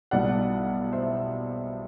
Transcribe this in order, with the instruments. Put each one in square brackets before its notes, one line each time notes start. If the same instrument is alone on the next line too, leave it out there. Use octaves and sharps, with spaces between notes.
[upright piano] B1 A2 G3 D5 F#5
C5 E5